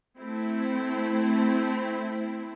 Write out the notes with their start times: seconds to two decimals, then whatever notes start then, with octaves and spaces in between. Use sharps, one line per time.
0.18 A3 C4 E4